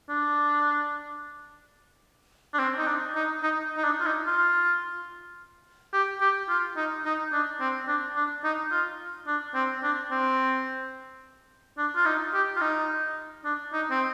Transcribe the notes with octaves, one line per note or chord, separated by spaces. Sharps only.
D4
D4
C4
D#4
D4
D#4
D#4
D#4
D4
F4
D#4
F4
G4
G4
F4
D#4
D#4
D4
C4
D4
D4
D#4
F4
D4
C4
D4
C4
D4
F4
D#4
G4
F4
D#4
D4
D#4
C4